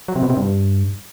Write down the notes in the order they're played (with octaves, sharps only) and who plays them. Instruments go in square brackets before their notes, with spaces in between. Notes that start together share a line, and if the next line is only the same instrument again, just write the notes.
[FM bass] F#3
C3
B2
C3
G2